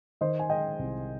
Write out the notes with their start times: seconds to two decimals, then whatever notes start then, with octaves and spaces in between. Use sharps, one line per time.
0.21 D#3 C5 D#5
0.39 G#5
0.50 G#3 D#5 G5
0.79 C2